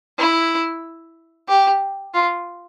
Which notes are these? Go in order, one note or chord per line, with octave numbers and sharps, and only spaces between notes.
E4
G4
F4